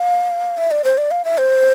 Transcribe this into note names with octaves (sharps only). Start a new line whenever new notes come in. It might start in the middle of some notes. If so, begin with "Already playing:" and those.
Already playing: F5
E5
D5
C5
D5
F5
E5
C5